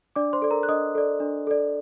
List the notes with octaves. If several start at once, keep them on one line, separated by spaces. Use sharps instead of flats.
D4 D5 D6
C5 C6
A4 D5
A#4 A#5
F#6
D4 D#5 D#6
A4 D5
D4
A4 D5